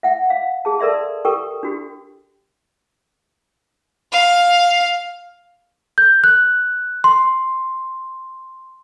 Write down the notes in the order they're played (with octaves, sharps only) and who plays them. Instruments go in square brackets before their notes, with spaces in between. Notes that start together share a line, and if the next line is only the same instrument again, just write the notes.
[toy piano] E5 F#5
F5
G#4 A5
A4 A#4 D5 E5 C6
G4 A4 A#4 G5 C#6
D4 F#4 G4
[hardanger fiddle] F5
[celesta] G6
F#6
C6